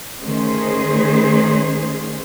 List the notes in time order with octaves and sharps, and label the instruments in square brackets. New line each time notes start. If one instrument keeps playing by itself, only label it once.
[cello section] D#3 A3 C#4 G#4 C5